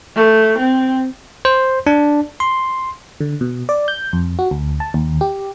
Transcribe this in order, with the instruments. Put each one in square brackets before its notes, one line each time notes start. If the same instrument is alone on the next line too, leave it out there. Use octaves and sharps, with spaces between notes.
[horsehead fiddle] A3
C4
[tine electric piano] C5
D4
C6
[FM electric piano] D3
B2
D5
G6
F2
F#4
D2
A5
D#2
G4